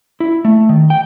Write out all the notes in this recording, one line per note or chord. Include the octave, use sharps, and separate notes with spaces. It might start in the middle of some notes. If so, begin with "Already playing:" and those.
E4
A3
D#3
G5